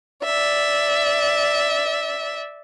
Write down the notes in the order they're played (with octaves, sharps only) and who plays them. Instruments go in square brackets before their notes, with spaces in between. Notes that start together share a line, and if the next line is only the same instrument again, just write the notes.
[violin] D5 E5